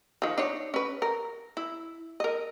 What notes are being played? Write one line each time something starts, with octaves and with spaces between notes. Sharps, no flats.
D#3 F3
D4 D#4 C#5
C#4 B4
A#4
E4
A#4 D#5